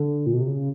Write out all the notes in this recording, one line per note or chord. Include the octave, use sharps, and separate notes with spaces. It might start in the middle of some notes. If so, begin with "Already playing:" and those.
Already playing: D3
A#2
B2
C3
C#3